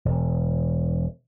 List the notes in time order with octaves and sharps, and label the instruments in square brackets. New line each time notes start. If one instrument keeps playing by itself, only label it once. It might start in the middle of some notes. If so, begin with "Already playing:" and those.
[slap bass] E1